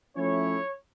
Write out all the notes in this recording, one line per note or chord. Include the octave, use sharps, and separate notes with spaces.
F3 A3 C#4 E4 C#5